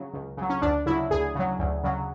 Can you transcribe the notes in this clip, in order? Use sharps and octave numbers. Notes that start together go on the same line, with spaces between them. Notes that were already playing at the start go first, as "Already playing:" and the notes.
Already playing: C#3 F#3
C#2
C#3 F#3
C#4
D2 D4
C#3 F#3 E4
D2 G#4
C#3 F#3
D2
C#3 F#3